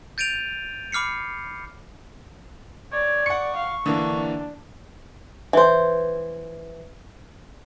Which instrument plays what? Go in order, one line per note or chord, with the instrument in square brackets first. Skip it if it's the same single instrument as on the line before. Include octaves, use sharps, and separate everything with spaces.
[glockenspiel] G6 A6 D7 D#7 F7
B5 D6 F6 C7 C#7
[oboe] C#5 [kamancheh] D5
[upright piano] F#5 C#7 [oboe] C#6
[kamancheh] F5
[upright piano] D3 E3 A#3 [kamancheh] D4
[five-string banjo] E3 C5